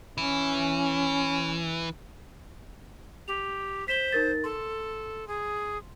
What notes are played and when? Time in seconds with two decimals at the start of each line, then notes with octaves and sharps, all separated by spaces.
0.18 E3 C#4
3.28 G4 F7
3.88 C5 B6 E7 G7
4.12 D#4 A#4 A6
4.44 A4 C6
5.28 G#4